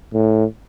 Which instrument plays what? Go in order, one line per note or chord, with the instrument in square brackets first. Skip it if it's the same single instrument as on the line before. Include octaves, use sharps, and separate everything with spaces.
[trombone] A2